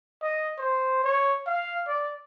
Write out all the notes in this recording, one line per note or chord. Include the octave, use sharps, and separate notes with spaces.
D#5
C5
C#5
F5
D5